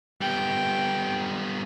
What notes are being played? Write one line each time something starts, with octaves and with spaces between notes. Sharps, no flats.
G3 B3 G5